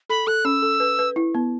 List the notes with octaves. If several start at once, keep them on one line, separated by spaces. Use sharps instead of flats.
A4 B5
A4 F#6
C#4 E6
A4
B4
B4
E4
B3